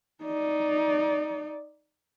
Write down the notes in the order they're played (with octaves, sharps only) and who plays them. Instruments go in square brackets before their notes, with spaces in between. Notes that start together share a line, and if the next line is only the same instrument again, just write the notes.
[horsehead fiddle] D#4 D5